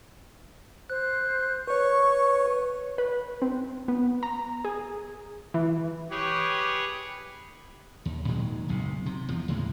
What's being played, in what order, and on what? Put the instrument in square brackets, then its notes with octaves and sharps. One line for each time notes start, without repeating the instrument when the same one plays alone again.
[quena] C5 [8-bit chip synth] F#6
[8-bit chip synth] B4 C#5 [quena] C#6
[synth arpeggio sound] B4
C4
B3
A#5
G#4
E3
[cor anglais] G4 [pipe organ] G#4 B4 C#5
[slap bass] D#2
A#2 D#3 F#3 G#3
F#1 B1 C3
C3
E2 F3
D#2 A2 C#3 G#3